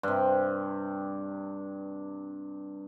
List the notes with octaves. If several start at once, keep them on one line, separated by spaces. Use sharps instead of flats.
G2 C3